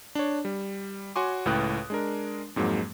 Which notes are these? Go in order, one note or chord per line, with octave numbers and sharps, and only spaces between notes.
D4 C#5
G3
F#4 C#5 G#5 C6 D6
C#2 A2 B4 G5 D#6 F#6
G#3 D4 A#4
F2 G#2 F#3 G#3 A#3